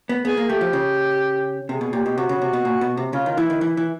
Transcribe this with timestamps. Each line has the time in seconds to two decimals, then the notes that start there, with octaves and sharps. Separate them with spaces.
0.09 B3
0.25 B3 G#4
0.37 A#3
0.49 A3 G4
0.61 F3
0.73 C#3
1.69 C3 G#4
1.81 B2
1.93 A#2 G4
2.06 B2
2.17 C3 F#4
2.29 C#3
2.42 C3
2.53 B2
2.65 A#2
2.81 B2
2.97 C3
3.13 C#3 F4
3.26 D#3
3.31 F4
3.37 E3 E4
3.50 D#3
3.61 E3 E4
3.77 E3